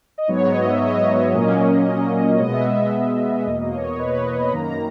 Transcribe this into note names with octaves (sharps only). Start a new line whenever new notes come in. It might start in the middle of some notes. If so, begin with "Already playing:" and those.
D#5
G#2 F#3 B3 C#5
D#5
E5
D#5
A#2 F#3 A#3 C#4
B2 G#3 B3 D#5
E5
D#5
E2 B2 A#3 D#5
D#5
C#5
C#5
B4
C#5
D#5
B5
F#2 D#3 A#3 A#5